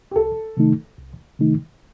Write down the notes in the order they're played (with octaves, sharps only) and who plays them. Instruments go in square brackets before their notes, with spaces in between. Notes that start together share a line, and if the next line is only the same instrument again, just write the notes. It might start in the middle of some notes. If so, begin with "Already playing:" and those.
[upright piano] G4
[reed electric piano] C2 [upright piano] A4
[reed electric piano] C3 D#3 A3 D#4
C2
C3 D#3 A3 D#4